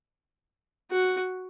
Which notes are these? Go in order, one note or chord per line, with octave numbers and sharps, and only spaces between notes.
F#4